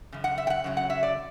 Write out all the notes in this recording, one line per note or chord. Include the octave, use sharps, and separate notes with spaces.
F#2 C#3
F#5
E5
G5
F#5
F#2 C#3 F#3
F#5
E5
D5